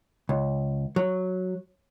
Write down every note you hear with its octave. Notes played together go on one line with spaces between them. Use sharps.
C#2
F#3